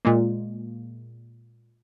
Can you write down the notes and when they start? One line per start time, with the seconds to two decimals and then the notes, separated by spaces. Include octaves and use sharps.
0.05 A#2 G#3 A#3